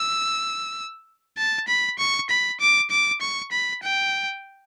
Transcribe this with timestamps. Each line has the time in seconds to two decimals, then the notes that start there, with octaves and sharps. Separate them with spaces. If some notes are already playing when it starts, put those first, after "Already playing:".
Already playing: E6
1.38 A5
1.68 B5
1.99 C#6
2.30 B5
2.60 D6
2.90 D6
3.21 C#6
3.52 B5
3.83 G5